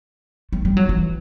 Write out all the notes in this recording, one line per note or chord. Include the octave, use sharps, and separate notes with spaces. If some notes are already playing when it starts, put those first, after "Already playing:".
A3
G3
F#3
E3